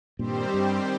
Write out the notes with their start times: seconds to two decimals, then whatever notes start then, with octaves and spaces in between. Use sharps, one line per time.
0.19 G2 A#2 D#3 G3 C4 G4 C5
0.54 G2